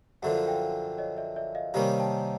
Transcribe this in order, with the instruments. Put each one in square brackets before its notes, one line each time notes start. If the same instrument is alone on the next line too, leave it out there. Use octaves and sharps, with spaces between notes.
[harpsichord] F#2 D3 F3 [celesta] E5 F#5
[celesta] F5 G5
C#5 D#5
D5 E5
D5 E5
D#5 F5
[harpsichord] C3 D#3 G3 A#3 C#4 [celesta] D#5 F5
[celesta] G5 A5